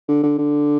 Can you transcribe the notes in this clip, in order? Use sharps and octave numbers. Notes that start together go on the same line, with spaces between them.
D3
D3
D3